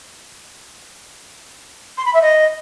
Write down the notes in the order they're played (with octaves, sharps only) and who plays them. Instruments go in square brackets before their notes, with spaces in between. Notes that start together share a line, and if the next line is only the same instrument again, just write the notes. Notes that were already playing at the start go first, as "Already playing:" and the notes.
[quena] C6
B5
E5
D#5